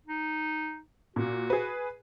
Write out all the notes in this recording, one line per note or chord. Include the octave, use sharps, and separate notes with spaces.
D#4
A#2 F#4
G#4 B4